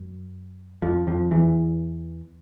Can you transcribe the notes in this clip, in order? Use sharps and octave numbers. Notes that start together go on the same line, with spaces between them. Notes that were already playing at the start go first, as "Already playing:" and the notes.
Already playing: F#2
F2 F3
F2 F3
E2 E3